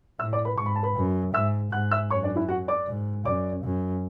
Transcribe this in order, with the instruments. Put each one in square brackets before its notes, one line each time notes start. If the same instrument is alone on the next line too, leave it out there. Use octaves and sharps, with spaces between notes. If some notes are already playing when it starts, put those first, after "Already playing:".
[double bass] A2 [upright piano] E5 E6
[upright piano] D5 D6
B4 B5
[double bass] G#2 [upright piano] C#6
[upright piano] B5
A5
B4 B5
[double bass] F#2
[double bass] G#2 [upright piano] E5 E6
[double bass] G#2 [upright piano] F#5 F#6
[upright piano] E5 E6
[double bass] F#2 [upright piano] C#5 C#6
[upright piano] D4 D5
E4 E5
F#4 F#5
D5 D6
[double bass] G#2
[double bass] F#2 [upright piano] D5 D6
[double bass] F#2